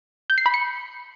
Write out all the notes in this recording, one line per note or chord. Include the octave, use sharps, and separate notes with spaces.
G6
C7
B5
C#7